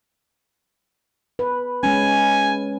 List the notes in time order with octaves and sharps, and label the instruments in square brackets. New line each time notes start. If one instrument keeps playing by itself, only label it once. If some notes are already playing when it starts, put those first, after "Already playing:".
[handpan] B4
[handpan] G#3 C#4 [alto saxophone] G#5